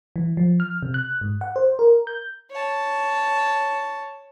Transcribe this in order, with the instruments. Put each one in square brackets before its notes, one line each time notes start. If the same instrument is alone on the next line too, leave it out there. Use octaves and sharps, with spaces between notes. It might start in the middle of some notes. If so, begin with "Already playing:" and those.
[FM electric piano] E3
F3
F6
C3
F#6
G#2
F#5
C5
A#4
G6
[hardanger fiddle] C#5 A5